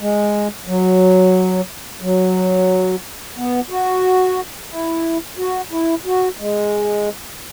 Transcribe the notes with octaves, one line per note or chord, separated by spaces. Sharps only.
G#3
F#3
F#3
B3
F#4
E4
F#4
E4
F#4
G#3